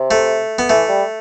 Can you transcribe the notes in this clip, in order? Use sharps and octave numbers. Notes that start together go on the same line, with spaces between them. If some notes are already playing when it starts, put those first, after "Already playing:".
Already playing: C3
A3
B3
E3 A3
G3